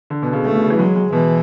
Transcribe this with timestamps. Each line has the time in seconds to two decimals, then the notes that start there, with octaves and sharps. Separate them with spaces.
0.10 D3
0.22 B2
0.33 C#3
0.44 C#3 A3
0.53 B2
0.62 C#3
0.70 E3
0.78 F#3 G#3
0.95 G#3
1.12 B2 E3